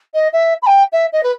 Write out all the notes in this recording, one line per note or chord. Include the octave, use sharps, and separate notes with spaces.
D#5
E5
B5
G5
E5
D#5
B4